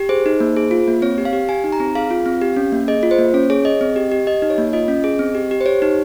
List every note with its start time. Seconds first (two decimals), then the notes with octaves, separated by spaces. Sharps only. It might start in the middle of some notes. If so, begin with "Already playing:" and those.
Already playing: G4
0.09 G#4 C5
0.26 D#4
0.40 A#3
0.56 G#4
0.71 F4
0.88 A#3
1.02 C4 C#5
1.18 G4
1.25 F5
1.33 G4
1.49 G4 G#5
1.64 D#4
1.72 A#5
1.80 C4
1.95 G#4 F5
2.10 F4
2.26 C4
2.42 G4
2.57 C#4
2.72 A#3
2.88 G#4 D#5
3.03 F4
3.11 C5
3.19 A#3
3.34 C#4 C#5
3.50 G#4 C#5
3.65 G#4 D#5
3.81 C4
3.96 G4
4.12 G4
4.27 G4 D#5
4.42 D#4
4.50 C#5
4.58 A#3
4.73 F4 D#5
4.88 C#4
5.04 G#4
5.19 C4
5.35 G4
5.51 G4
5.61 C5
5.66 G4 C#5
5.82 D#4